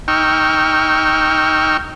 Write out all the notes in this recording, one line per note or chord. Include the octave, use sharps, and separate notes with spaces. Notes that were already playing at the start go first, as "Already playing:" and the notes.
D#4 G5 C#6 E6 F6